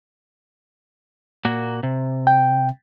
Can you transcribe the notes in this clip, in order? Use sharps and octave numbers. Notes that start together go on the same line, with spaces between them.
A#2 A#3 F#4
C3
G5